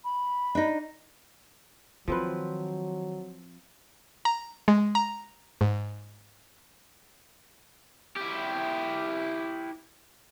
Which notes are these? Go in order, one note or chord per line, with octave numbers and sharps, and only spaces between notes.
B5
D4 D#4
D#3 F3 F#3 C4 B4
A#5
G#3
A#5
G#2
E4 G4